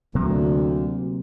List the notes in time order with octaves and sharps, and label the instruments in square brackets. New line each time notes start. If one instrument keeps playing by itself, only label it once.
[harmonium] D2 [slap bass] C3 F#3 A#3